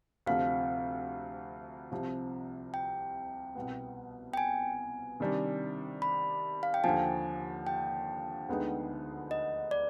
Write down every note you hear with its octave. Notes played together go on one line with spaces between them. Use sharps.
D2 C3 F3 F5
C2 C3 F3
G5
C2 B2 B3
G5
G#5
C3 D#3 G3 D4
B5
F5
G5
D#2 D3 F3 G#5
G5
D2 D3 G#3 B3 D#4
D#5
D5